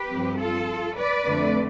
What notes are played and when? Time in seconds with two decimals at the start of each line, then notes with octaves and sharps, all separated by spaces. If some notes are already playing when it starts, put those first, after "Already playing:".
Already playing: G4 B4
0.09 G2 F3 C4
0.38 F4 A4
0.96 B4 D5
1.25 F2 D3 A3 C4